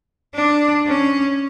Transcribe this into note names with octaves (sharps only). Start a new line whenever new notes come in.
D4
C#4